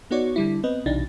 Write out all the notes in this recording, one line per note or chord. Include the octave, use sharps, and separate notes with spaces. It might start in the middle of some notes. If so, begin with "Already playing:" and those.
B3 D#4 F#4 C#5 D5
D3 G3 E4
B3 C4 B4 D#5
B1 C3 E3 D4 D#4 A6